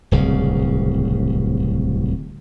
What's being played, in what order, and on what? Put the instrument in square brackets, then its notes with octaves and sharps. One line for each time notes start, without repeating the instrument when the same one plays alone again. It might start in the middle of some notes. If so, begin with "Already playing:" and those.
[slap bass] D1 C2 C#3